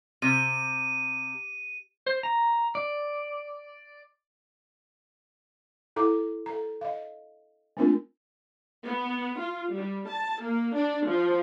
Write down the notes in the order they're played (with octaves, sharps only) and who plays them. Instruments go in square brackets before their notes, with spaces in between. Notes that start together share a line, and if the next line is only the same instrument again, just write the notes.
[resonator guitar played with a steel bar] C3 [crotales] D#7
[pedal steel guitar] C5
A#5
D5
[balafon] E4 A4 A#5 D6
A4 A#5
D#5 F5
A3 A#3 C4 D4 F4 A#4
[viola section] B3
F4
G3
A5
A#3
D4
F3